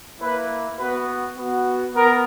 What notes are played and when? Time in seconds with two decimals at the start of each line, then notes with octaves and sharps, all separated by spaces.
0.20 A#3 E4 B4
0.79 B3 F#4 B4
1.38 B3 F#4
1.96 B3 A#4